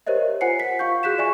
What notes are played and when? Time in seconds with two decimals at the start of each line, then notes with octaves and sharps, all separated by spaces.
0.07 G4 A#4 C5 C#5 D#5 E5
0.41 F4 C5 F#5 G#5 C7 C#7
0.60 B6
0.79 F4 F5 C#6 G6
1.03 F#4 G#4 F#6 G6 B6 E7
1.18 D5 E5 G#5 C#6